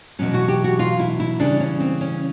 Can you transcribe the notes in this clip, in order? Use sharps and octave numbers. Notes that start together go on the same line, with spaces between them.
E2 B2 F#3 C#4
F#4
G4
F#4
F4
E4
E4
C#3 E3 G3 D4
C#4
C4
C#4